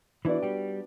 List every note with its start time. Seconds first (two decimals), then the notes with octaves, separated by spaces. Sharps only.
0.25 E3 B3 D4 E4 F#4 B4 D5
0.43 G3 G4